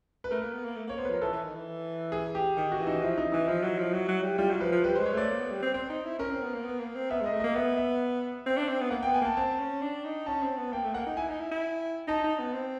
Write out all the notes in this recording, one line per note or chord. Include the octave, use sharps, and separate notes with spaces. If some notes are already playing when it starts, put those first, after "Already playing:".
B4
A3 A#4
A#3
B3
A#3
A3
A#3 C#5
B3 C5
B4
F3 A#4
E3 A4
E3
D#3
E3
G#4
G4
D#3 G4
F#4
E3
D#4
F3 E4
D#4
E3 D#4
F3 E4
F#3
F3
F#3
F#3
G3
G3 F4
F#3
F3 B4
F3
G3 B4
G#3 C5
C#5
A3 D5
A#3
B3
G3
C4
C4 C5
D#4
E4
C#4 A#4
C4
B3
A#3
B3
A#3
C4
B3 E5
G#3 D#5
A3
A#3 D#5
B3 E5
E5
C4
D4
C4
B3
A#3 F#5
B3 G5
G#5
A#3 A5
C4 A5
C#4
D4
D#4
C#4 A5
C4
B3
A#3 G5
A3
A#3 F#5
D#4
E4 G#5
D#4
E4
E4
D#4 A5
D#4
B3
C4